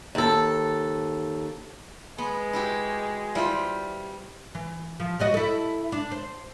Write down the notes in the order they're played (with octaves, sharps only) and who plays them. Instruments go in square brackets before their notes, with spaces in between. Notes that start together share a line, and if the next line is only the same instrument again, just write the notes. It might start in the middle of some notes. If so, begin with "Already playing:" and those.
[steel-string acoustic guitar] D#2 A4
[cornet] G#3 [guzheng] B3
[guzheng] E4 F#4 G4
[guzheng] G3 C5 [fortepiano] E4 F4
[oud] E3
F3
G3 F#4 D#5
E4 A4
D4
C5